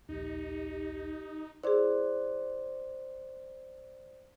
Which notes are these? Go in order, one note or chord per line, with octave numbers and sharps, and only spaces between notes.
A#1 D#2 D#4 G4
E4 G#4 C5 D5